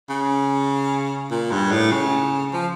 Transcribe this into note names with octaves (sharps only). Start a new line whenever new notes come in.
C#3
A#2
G2
A2
C#3
F3